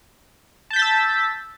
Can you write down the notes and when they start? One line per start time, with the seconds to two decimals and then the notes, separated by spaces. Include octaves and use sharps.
0.70 A5
0.73 G6
0.76 B6
0.79 A6
0.82 E6